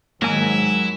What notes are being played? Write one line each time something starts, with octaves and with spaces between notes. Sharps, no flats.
G#2 D#3 F#3 G#3 A#3 E4 G#5